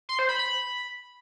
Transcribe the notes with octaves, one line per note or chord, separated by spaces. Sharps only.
C6
C5
B5
B5